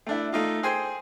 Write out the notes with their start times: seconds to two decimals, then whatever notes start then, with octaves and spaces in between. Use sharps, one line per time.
0.07 A3 D4 E4
0.32 A3 D#4 F4
0.63 G#4 C5 G5 G#5